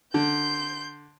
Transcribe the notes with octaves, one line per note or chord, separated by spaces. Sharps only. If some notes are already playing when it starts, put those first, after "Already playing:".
D3 C6 G6